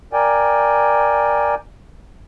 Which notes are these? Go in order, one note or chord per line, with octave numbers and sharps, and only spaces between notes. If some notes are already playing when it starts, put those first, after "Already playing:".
A#4 D5 G5 G#5